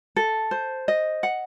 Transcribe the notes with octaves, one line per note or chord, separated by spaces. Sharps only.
A4
C5
D#5
F#5